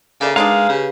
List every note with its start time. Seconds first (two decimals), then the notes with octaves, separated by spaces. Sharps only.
0.21 C#3 A#3 A4 C#5 D5 E5
0.36 G#3 D4 D#4 A#4 B4 F5
0.69 C#3 G4 B4